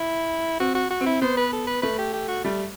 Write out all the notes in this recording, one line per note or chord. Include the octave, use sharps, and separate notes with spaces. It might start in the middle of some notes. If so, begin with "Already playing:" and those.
Already playing: E4
C4 F#4
F#4
F#4
C4
E4
B3 C5
B4
A4
B4
A3 B4
G4
G4
F#4
G3 A3